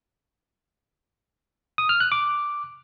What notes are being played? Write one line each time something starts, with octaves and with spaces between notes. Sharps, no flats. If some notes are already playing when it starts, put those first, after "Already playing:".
D#6
F6
F#6
D6